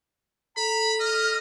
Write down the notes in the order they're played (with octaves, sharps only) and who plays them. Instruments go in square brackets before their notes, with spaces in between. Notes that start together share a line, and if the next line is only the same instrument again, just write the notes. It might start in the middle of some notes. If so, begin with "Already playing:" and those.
[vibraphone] A4 [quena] A#5 [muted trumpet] B5
[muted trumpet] D#5 [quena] F6